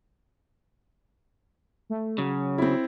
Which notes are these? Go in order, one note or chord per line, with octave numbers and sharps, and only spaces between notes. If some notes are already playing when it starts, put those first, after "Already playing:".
A3
C#3 F#3
C4 E4